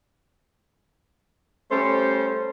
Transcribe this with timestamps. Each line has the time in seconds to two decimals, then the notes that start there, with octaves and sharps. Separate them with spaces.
1.71 G3 A3 C#4 C5